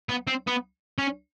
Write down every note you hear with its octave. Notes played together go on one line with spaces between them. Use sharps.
B3
C4
B3
C#4